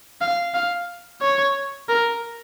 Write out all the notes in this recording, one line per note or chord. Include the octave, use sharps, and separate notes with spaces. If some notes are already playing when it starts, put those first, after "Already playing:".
F5
F5
C#5
A#4